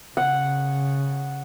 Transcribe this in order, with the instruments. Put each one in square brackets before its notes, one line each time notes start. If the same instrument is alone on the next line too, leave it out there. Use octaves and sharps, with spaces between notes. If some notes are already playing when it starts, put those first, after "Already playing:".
[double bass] C#3 [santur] F#5